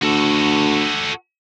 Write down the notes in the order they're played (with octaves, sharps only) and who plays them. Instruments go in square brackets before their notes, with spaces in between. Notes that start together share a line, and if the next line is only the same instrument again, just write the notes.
[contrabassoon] D2 [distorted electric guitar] F#4 A4